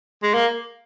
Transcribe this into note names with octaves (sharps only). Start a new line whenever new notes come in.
G#3
A#3